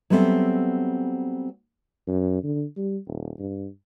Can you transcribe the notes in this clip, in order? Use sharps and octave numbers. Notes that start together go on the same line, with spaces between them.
F#3 G3 B3 C4 A4 E5
F#2
D3
G3
D#1
G2